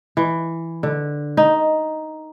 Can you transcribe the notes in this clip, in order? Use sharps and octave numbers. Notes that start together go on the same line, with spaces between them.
E3
D3
D#4